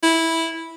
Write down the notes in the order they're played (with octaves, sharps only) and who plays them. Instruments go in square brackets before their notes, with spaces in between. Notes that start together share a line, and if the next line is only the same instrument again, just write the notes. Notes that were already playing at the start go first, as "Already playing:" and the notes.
[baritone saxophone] E4